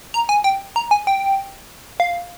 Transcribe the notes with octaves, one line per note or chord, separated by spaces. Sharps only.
A#5
G#5
G5
A#5
G#5
G5
F5